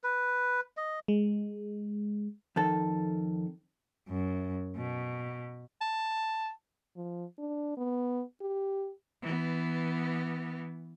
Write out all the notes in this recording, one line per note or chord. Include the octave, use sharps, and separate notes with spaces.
B4
D#5
G#3
F2 D#3 A4
F#2
B2
A5
F3
D4
B3
G4
E3 B3